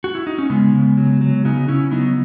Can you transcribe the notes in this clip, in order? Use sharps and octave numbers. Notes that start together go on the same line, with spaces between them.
F#4
E4
D#4
C#4
C#3 G#3 B3
C#3
F#3
F#3
C#3 B3 D#4
C#3 C#4 E4
F#3 B3 D#4